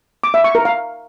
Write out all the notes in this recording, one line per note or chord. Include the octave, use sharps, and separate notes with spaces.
D6
E5
C#6
A#4
F5